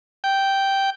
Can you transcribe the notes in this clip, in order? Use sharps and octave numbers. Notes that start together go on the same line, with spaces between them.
G5